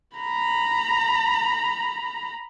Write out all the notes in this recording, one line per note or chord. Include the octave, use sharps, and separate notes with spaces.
A#5 B5